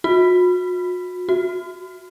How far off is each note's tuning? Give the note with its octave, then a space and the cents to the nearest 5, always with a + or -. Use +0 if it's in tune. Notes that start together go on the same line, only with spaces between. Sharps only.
F#4 -40
F#4 +0